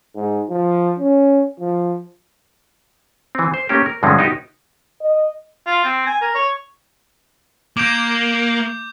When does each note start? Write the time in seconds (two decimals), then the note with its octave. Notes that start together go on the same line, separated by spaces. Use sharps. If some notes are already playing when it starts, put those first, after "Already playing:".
0.15 G#2
0.50 F3
0.99 C#4
1.60 F3
3.35 E3 C4
3.54 C5
3.69 A3 A#3 C#4 G4
3.86 A#4
4.03 G2 D3 F3 G#3 C4 C#4
4.18 B3 D#4 E4 F#4 G4 F#5
5.01 D#5
5.66 F4
5.84 C4
6.07 G#5
6.21 A#4
6.35 C#5
7.77 A#3 D6 G6